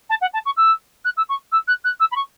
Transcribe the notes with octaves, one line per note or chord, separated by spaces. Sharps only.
A5
F#5
A5
C#6
E6
F#6
E6
C#6
E6
F#6
F#6
E6
B5
C#6